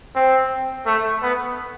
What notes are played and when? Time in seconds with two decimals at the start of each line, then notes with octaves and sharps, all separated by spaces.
0.15 C4
0.86 A3
1.23 B3